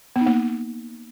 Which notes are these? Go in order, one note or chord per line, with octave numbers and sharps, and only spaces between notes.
B3
D#4
A#3